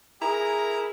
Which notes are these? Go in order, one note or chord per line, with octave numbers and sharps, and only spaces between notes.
E4 G#4 A#4 A#5